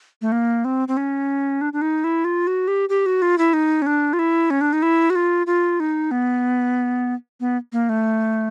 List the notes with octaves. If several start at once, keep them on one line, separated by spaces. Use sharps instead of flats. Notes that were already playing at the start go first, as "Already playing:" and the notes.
A3
A#3
C4
C4
C#4
D4
D4
D#4
E4
F4
F#4
G4
G4
F#4
F4
E4
D#4
C#4
D4
F4
E4
C#4
D4
D#4
E4
F#4
F4
F4
D#4
B3
B3
A#3
A3